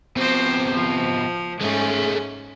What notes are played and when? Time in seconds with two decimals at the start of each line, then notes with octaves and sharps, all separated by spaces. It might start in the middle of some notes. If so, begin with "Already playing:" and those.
0.17 B2 F3 C4 C5
0.73 F3
1.61 G#2 G#3 A3 C#4